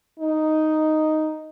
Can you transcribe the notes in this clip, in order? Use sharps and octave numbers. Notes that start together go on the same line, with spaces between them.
D#4